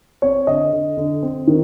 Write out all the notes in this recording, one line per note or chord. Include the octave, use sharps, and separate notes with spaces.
C4 C#5
D3 D#5
D3
D3
C4
D#3